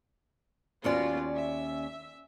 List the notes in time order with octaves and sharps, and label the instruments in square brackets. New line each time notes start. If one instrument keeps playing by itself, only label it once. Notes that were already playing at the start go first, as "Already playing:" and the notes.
[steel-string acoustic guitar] D#2 C#4 D5 [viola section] B3 F4 F#4
[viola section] E5